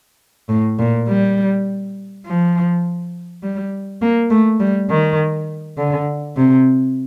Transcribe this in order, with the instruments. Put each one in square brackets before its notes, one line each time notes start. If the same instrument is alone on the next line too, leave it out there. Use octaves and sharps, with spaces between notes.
[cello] A2
A#2
G3
F3
G3
A#3
A3
G3
D#3
D3
C3